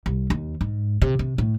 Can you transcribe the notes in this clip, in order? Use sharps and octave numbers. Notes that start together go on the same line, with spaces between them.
C2
D#2
G#2
C3
C3
A2